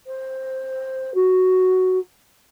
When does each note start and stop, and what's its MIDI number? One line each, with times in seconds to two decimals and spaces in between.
0.06 1.11 72
1.14 1.98 66